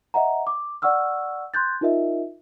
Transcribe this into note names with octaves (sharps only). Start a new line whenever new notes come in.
D#5 E5 F#5 A#5
D6
D5 F#5 C#6 E6 F6
C6 F#6 G6 A6
D#4 F4 A#4 D#5 E5